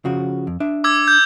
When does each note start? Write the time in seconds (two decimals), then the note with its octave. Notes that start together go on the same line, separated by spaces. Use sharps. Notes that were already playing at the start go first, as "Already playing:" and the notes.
0.05 C#3 F3 F#4
0.47 F2
0.60 D4 E5
0.84 D6 E6 G#6
1.08 G6